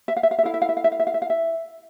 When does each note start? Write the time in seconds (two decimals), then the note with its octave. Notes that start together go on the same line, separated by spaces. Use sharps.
0.08 E5
0.16 F5
0.23 E5
0.31 F5
0.39 E5
0.43 E4 A4 F5
0.54 E5
0.62 F5
0.69 E5
0.77 F5
0.84 E5
0.92 F5
1.00 E5
1.07 F5
1.14 E5
1.22 F5
1.30 E5